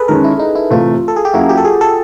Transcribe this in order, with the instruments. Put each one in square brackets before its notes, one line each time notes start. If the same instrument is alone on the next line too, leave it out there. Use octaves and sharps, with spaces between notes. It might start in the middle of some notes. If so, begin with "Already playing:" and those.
Already playing: [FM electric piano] G#4 A4 B4
[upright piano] D#3 G#3 C#4 [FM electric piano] A#4
[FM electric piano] E4
D#4
E4
[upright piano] C3 E3 A3 [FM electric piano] F4
[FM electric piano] A4
G#4
G4
[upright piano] F#3 A#3 C#4 E4 [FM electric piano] F#4
[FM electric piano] G4
A4
G#4
A4